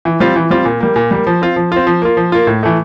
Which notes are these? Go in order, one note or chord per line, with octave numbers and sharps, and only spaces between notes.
E3
G3 C4 F4
E3
G3 C4 F4
A#2
G3 A#3
A#2
G3 A#3
F3
C4 F4
F3
C4 F4
F3
A#3 F4
F3
A#3 F4
A2
E3 A3